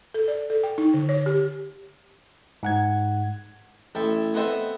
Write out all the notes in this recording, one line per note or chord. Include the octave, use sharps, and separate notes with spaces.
A4
D5
A4
G5
D#4
D3
C#5
G4
G#2 F#5 G#6
A1 A4 E5 G5 A5
B3 C4 A4 D#5 E5 G5